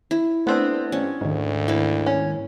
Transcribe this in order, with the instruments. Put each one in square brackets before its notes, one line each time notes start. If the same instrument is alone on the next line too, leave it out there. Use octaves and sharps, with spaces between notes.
[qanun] E4
[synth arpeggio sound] A3 D4 [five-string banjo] B3 C4 [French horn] C5
[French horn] G2 [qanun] C#4
[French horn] D2 [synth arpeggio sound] G#2 D#3
[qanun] A#3 E4 B4
[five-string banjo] C#4